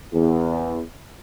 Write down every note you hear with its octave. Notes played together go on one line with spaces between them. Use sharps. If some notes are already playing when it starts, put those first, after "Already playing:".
E2